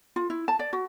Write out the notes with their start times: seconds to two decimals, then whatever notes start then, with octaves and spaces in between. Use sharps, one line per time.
0.16 F4
0.30 E4
0.48 A5
0.59 D5
0.73 F#4